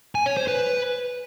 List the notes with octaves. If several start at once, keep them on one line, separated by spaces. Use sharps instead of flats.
G#5
C#5
C5
B4